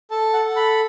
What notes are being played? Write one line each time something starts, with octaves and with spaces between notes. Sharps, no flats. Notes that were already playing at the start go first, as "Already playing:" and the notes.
A4 A5
F#5
A4
B5